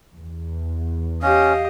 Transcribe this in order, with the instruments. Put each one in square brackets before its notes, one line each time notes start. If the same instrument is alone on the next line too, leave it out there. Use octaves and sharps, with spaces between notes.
[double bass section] E2
[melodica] C#4 [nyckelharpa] G4 D#5 [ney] F5